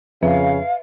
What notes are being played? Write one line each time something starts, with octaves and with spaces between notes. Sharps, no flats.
F2 C#3 B4 E5 F5